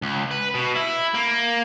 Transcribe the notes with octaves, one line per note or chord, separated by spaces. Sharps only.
C#2
B4
B2
E4
A#3